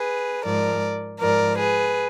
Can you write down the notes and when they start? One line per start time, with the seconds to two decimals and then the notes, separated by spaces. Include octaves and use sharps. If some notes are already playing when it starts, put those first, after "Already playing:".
Already playing: G#4 B4
0.44 G#2 F3 A#4 D5
1.19 G#2 F3 A#4 D5
1.57 G#4 B4